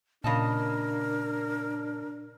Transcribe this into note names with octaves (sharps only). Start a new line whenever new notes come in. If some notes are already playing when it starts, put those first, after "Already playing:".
A#2 C#3 D4 A#4 D#5 A5